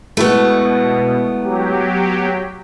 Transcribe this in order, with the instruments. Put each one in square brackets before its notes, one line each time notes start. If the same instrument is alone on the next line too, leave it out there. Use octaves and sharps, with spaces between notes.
[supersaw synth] B2 [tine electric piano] G#3 E4 C#6 [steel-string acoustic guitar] A3 B3
[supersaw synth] F#3 G4